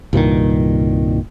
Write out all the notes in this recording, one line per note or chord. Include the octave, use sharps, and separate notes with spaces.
C2 G2 A#2 D#3